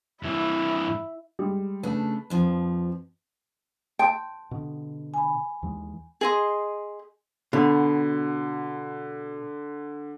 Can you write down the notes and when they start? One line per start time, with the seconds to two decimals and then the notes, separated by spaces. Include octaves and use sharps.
0.23 G2 E3 E4
1.39 G3 G#3
1.83 C#3 A3 D4 B4 A5
2.30 F2 F3
3.99 G5 A5 C6
4.51 B2 D3
5.14 G#5 B5
5.63 D#2 E3 G#3
6.21 G#4 D#5 C6
7.53 B2 D3